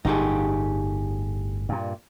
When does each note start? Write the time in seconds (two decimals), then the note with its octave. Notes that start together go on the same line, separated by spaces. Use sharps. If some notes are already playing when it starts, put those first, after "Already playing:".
0.05 G1 A2 D#4 G4 G#4
1.69 G2 A#2